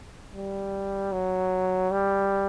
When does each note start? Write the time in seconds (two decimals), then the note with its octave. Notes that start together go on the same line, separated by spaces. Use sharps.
0.33 G3
1.12 F#3
1.91 G3